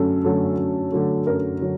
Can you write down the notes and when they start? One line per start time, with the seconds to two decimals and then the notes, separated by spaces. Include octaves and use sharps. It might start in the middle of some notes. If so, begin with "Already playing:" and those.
Already playing: F#2 D3 F#3 A3 A4
0.24 D3 F#3 A3
0.58 F#2
0.92 D3 F#3 A3
1.26 F#2 A#4
1.61 D3 F#3